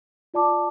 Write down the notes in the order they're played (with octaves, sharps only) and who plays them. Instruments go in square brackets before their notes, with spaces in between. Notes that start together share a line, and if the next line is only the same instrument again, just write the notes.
[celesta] F4 D5 A5 D6